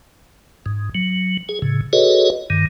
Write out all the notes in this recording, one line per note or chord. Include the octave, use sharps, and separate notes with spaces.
G#2
F#3
G#4
A2 C#3
F#4 G#4 A4 B4 C#5 D#5
G2 D#3